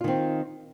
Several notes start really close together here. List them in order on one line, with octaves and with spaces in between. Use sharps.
F4 D#3 C4